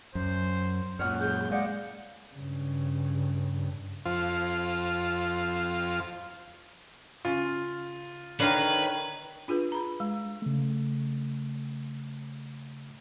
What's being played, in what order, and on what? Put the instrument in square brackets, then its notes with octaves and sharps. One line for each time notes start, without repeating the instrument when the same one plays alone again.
[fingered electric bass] F#2 [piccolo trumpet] C5
[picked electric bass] F#2 A#2 [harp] C#5 F#5 D#6 [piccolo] F6
[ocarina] G#4 [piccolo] G6
[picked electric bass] G#3 [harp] D5 [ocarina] F5 [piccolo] F#5
[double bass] G2 C#3
[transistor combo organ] F2 F4 C5
[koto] C#3 [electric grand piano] F4
[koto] D3 F5 A#5 [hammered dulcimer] D#3 C#5 [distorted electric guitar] B4
[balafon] D4 F4 G#4 B4
A#5 B5
G#3
[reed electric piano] C#3 A3